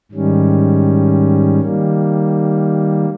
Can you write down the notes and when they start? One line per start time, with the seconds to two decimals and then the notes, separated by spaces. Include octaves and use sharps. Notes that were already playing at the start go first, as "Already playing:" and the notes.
0.12 G#2 D#3 G3 C#4
1.61 D#3 G3 A#3